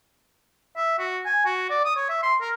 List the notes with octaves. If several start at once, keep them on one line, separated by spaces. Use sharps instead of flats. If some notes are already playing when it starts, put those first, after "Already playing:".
E5
F#4
G#5
F#4
D5
D#6
C#5
E5
C6
A#4